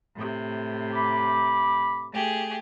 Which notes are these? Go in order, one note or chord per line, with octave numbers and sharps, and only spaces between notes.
A2 C3
B5 D6
A3 G4 G#4